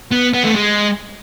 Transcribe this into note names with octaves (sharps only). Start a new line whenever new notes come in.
B3
B3
A3
G#3